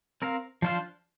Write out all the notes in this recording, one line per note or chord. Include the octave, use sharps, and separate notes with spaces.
C4 A#4 F5
F3 D4 F4 C5 F5